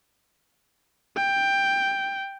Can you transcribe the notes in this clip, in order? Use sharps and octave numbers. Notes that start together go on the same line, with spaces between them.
G5